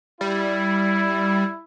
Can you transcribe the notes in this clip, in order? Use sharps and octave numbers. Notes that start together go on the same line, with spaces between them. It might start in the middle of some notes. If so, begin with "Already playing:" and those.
G3 E4